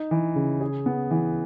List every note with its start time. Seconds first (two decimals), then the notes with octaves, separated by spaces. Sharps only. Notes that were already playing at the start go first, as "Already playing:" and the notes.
Already playing: D#4
0.11 E3
0.36 C#3
0.61 G#4
0.86 B3
1.11 E3